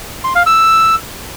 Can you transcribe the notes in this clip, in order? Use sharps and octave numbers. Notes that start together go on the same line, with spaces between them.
C6
F5
E6